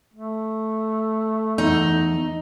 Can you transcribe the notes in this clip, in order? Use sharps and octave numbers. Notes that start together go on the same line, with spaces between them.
A3
E2 D#4